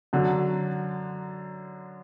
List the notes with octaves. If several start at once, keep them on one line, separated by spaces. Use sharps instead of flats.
F#2 D3 F#3